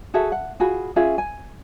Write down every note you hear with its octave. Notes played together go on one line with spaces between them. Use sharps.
F#4 G#4 A4 E5
F#5
F4 F#4 G#4 B5
C#4 F4 G#4 E5
G#5